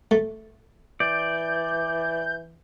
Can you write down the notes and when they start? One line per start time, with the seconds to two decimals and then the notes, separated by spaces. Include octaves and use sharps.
0.11 A3
1.00 E3 D5 G6